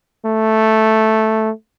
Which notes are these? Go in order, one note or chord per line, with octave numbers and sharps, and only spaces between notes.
A3